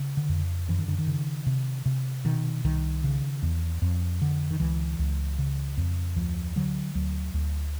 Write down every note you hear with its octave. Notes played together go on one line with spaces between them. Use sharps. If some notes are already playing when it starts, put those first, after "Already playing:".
Already playing: C#3
D3
F2
F#2 E3
D#3
D3
D#3
C#3
C3
C3
B2 D#3
C2 D#3
C#3
E2
F2
D3
D#3
C#2 E3
C#2
C#3
F2
D2 F3
D3 F#3
D2 F#3
D2